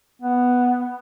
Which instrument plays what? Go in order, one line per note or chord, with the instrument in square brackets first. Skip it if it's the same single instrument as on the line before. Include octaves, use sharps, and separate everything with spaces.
[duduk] B3